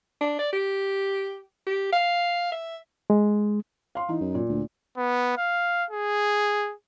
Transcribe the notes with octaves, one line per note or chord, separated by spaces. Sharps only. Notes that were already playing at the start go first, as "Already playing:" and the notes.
D4
D5
G4
G4
F5
E5
G#3
F5 C6
E3 D#4
F#2
A#2
D2
B3
F5
G#4